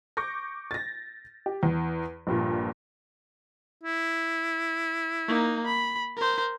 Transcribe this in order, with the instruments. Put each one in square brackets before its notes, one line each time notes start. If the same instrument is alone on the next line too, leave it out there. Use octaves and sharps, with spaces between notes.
[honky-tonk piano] C#6 D6 G6 A#6
A6 A#6
G4
E2
A#1 G2 A#2
[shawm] E4
[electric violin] A#3 D#4
B5
A#4 C5